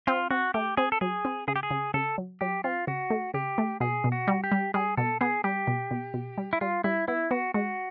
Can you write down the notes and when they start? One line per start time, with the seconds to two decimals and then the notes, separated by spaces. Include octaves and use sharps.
0.07 C4 F4
0.31 C4 F#4
0.54 A3 G4
0.77 C4 G#4
0.92 A4
1.01 F#3 G#4
1.25 C4
1.48 C#3 G#4
1.56 G4
1.63 G#4
1.71 C#3
1.94 C#3 A4
2.18 F#3
2.41 F#3 G4
2.64 C4 F4
2.87 C#3 F#4
3.10 A3
3.34 C#3 G4
3.58 A3
3.80 B2 G#4
4.04 B2
4.12 F#4
4.28 G3
4.44 G4
4.52 G3
4.74 G3 G#4
4.97 B2 A4
5.21 B3 G#4
5.44 G3 G4
5.67 B2
5.91 B2
6.14 B2
6.38 G3
6.53 E4
6.61 G3 F4
6.84 G3 E4
7.08 B3 E4
7.31 B3 F#4
7.54 G#3 F#4